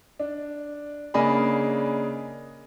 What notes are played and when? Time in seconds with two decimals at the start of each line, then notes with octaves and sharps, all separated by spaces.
0.20 D4
1.14 C#3 A#3 D4 G#4 D#5 B5